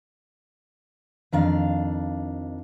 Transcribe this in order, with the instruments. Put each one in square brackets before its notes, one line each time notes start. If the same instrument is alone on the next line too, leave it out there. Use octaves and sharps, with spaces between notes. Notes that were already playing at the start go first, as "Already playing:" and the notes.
[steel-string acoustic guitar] F2 D#3 D4 F5